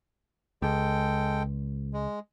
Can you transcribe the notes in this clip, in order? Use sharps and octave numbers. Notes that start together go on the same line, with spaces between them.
C#2 G#3 A4 G5
G#3